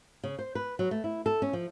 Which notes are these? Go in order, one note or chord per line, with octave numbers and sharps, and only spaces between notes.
C#3
C5
B4
F#3
A3
E4
A4
C#4
F3